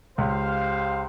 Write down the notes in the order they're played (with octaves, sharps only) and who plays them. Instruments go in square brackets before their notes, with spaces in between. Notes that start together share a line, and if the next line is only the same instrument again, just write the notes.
[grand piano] C#2 [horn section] G4 C5 F5